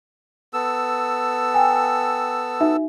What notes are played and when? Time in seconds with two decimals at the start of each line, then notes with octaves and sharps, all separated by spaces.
0.54 B3 A4 E6
1.54 G5 G#5
2.61 D#4 F#4 E5